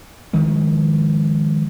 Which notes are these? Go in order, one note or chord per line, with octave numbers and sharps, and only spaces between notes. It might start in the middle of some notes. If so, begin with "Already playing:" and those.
D#3 F3 G#3